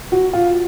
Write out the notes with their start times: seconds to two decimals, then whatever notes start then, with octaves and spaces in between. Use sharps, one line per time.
0.12 F#4
0.33 F4